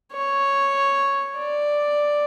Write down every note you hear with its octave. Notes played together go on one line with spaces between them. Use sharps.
C#5
D5